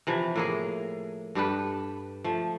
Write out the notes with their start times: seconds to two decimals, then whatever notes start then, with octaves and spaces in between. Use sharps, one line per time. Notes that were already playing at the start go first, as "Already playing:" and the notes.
0.07 C3 E3 F3
0.36 A2 A#3 G#4
1.35 G2 G4 A4 B4
2.24 F3 A3